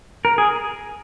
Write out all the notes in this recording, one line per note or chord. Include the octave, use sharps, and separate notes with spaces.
A#4
G#4